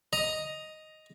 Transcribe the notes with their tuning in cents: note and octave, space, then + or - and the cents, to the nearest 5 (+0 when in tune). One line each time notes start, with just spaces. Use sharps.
D#5 +0 A#5 +10